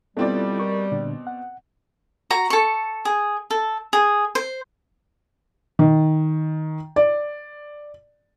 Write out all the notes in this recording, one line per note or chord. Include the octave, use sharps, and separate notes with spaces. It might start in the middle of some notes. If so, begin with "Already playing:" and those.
B2 G3 C4 E4 F4 A4 D5
A#4 C#6
A#2 D3 D4
F#5
F#4 A#5
A4 C#6
G#4
A4
G#4
C5
D#3
D5